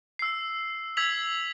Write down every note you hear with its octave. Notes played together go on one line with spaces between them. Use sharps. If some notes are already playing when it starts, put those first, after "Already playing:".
E6 C7
E6 G#6 B6 F7 F#7